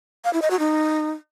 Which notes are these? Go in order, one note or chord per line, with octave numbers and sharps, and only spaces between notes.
F5
E4
D#5
F#4
D#4